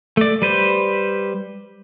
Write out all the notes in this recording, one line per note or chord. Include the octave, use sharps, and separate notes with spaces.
A3 D5
G3 B4 C5